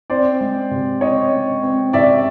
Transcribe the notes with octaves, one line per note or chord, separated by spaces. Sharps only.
C4 C5 D5
G#3
C3
C4 C#5 D#5
G#3
C4
C3 D5 E5